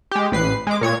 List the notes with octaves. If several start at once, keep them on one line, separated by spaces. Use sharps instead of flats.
G#3 G4
A1 B4 C7
G#3 D6
A#2 C#5 G#6